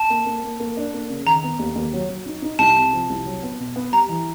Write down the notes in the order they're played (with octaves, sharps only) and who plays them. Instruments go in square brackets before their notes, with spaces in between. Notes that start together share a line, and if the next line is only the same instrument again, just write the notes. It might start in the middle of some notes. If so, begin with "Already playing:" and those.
Already playing: [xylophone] A5
[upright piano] A#3
A#3
A#3
A#3
D4
A#3
C#3
[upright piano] D#3 [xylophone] A#5
[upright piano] B3
D#2
D#2
F#3
F#3
D#4
D#4
[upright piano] C2 [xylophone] A5
[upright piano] C3
F3
C2
F#3
B3
B2
B3
[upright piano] G3 [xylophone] A#5
[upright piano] E3